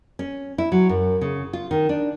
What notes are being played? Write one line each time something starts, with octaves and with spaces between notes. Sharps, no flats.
C#4
E4
F#3
F#2
C#3
F4
D#3
D4